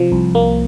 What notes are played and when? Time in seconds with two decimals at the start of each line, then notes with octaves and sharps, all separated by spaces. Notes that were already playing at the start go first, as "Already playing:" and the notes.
Already playing: C3 F3
0.12 C2
0.35 A#3